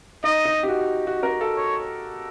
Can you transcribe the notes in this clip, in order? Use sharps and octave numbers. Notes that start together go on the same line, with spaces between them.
D#4 D#5
D#4
G4
F#4
F#4
A#4
A4
C#5